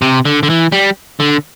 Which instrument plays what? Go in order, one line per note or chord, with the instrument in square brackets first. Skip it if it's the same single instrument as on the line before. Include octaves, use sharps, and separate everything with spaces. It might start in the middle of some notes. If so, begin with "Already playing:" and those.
[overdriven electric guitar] C3
D3
D3
E3
G3
D3